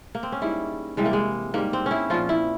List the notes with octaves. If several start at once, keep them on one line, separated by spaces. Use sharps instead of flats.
A#3
C4
C#4
G#2 G3 E4
C3 E3 G3 G#3
A#3
G#3
G#2 G3 A#3
C4
C#4 E4
A#2 F3 F4
E4